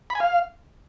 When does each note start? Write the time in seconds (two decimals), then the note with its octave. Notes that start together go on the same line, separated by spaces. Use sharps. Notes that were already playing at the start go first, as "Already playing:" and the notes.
0.10 B5
0.15 G#5
0.20 F5